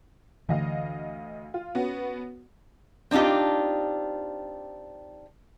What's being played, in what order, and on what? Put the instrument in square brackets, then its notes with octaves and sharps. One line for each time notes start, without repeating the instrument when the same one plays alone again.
[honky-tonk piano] D2 D#5 F5 [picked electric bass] D3 E3
[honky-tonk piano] F4
B3 C#4 F#4
[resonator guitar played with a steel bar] C4 D4 D#4 F4 G4